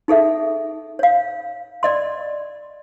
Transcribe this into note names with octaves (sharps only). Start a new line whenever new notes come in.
D#4 G#4 A4 E5
C#5 F5
D5 D#5 C6